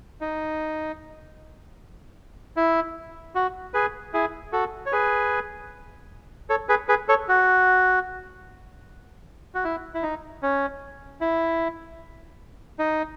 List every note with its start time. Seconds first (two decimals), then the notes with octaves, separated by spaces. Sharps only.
0.21 D#4
2.57 E4
3.35 F#4
3.74 G#4 B4
4.13 E4 G#4
4.52 F#4 A4
4.86 C#5
4.92 G#4 B4
6.50 A4 C#5
6.69 G#4 B4
6.89 G#4 B4
7.08 A4 C#5
7.29 F#4
9.55 F#4
9.64 E4
9.94 E4
10.03 D#4
10.43 C#4
11.21 E4
12.79 D#4